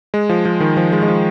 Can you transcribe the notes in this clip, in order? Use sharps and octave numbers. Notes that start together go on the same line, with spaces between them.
G#3
F3
F3
D#3
F3
G#3
G#3
F3